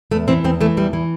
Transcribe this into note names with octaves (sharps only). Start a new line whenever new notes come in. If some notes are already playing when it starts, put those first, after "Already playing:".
E2 A3
E3 C4
E2 C4
E3 A3
E2 G3
E3